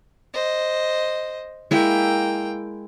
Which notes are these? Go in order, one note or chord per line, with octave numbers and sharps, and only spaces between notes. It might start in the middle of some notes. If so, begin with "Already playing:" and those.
C5 D#5
G#3 A#3 E4 G5